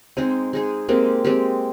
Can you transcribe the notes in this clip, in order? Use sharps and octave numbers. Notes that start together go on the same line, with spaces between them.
G#3 C4 D#4 G#4
G#3 D#4 G#4
G#3 A#3 C4 G4
G#3 C4 G4